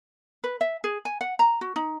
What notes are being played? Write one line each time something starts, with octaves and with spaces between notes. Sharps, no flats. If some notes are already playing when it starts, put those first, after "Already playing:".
B4
E5
G#4
G#5
F#5
A#5
F#4
D#4